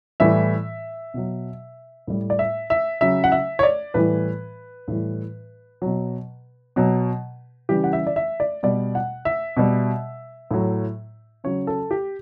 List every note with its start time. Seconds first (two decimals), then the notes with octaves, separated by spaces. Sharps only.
0.20 A2 E3 G3 E5
1.14 B2 F#3
2.07 A2 G3
2.30 D5
2.39 E5
2.70 E5
3.01 C#3 F#3 E5
3.24 F#5
3.32 E5
3.59 C#5
3.63 D5
3.94 A2 E3 G3 B4
4.88 A2 E3 G3
5.82 B2 F#3
6.76 B2 F#3
7.69 C#3 E3 G3 G4
7.84 F#5
7.93 E5
8.07 D5
8.16 E5
8.40 D5
8.63 B2 G3 D5
8.95 F#5
9.25 E5
9.57 B2 G3
10.51 A2 F#3
11.44 C#3 F#3 C#5
11.67 A4
11.91 G4